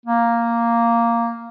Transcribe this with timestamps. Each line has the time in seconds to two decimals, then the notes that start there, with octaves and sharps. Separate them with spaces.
0.06 A#3